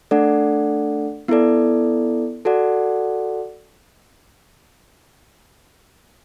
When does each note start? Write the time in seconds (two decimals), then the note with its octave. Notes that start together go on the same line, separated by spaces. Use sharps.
0.11 A3 D4 A4 D5 F#5
1.28 B3 E4 A4 D5
2.45 F#4 A4 D5 F#5